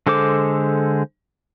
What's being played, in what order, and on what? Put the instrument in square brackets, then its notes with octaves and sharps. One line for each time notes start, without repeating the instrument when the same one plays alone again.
[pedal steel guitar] D3 G#3 A4 C5 D6